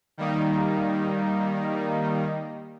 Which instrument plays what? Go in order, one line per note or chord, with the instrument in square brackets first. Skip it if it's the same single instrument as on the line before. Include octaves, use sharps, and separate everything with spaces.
[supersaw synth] D#3 G3 A#3 D#4